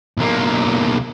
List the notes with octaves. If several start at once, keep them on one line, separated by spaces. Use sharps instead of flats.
B1 A#3